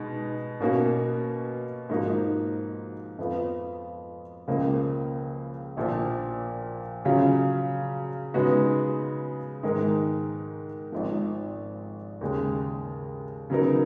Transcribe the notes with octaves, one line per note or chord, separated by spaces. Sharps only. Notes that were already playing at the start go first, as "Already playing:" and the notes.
Already playing: B2 G#3 D#4
B2 A#3 C#4 F#4
G#2 F3 A#3 D#4 F#4
F2 F3 B3 F4
C#2 C#3 F3 A#3
A#1 A#2 F3
C#3 F#3 C#4 F4
C#3 G#3 B3 D#4 F#4
G#2 D#3 G#3 D#4 A#4
G#1 G#2 F3
D#2 C#3 G#3
C#3 F#3 B3 D#4 A#4